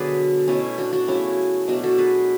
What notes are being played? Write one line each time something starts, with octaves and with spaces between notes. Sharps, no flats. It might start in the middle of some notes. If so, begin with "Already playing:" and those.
Already playing: B2 D3 F#3 B3 G#4 B4 D5 E5
B2 A3 C#4 E4
D4 F#4
D4 F#4
C#3 F#3 A3 C#4 E4
B2 F#3 A3 D4 F#4
F#4 A4
G#4 B4